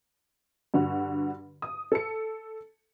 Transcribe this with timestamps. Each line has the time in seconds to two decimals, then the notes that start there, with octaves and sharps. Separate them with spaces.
0.74 G2 D3 F#4
1.62 D#6
1.92 A4 C#7